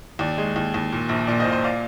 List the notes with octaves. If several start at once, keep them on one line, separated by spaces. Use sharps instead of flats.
D#2 D5
G#3
D#2
D#2
A#2
A#1
A#2 D5
C5 D#5
A#2
C5 D#5
D5 F5